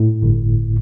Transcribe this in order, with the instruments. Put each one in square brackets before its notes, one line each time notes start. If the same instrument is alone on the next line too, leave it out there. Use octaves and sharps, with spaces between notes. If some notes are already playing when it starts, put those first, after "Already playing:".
Already playing: [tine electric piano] A2
G1